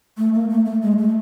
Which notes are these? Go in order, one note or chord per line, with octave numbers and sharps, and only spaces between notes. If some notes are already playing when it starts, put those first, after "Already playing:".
A3
A#3
A3
A3
G#3
A3